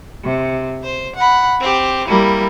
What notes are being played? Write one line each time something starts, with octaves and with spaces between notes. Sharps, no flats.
C3
C5
F#5 B5
C4 G4
G3 A#3 E4